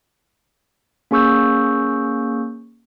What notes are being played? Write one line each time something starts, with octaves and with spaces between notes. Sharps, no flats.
A#3 C#4 G#4 C#6 E6 G6